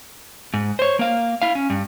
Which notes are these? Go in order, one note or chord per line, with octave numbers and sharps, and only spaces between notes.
G#2
C5 C#5
A#3 F5
E4 F5
C#4
G2